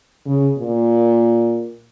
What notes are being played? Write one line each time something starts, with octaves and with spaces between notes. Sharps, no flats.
C#3
A#2